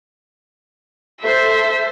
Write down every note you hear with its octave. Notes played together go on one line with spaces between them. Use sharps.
A4 C5 E5